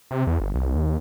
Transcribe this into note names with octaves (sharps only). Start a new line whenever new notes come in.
C3
E2
G1
C2
D#2